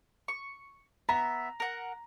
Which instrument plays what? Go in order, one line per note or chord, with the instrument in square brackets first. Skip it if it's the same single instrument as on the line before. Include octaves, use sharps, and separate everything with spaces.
[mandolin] C#6
[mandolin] B3 E5 [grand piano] A#5
[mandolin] A#4 F#5